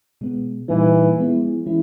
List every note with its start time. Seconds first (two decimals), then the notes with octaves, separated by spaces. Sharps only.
0.21 B2 G#3 B3
0.68 A#2 E3 G3 A#3 D#4
1.17 F3 G#3 B3 E4
1.66 E3 G#3 C#4 E4